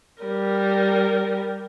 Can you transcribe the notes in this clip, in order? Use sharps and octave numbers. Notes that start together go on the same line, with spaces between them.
G3 A#4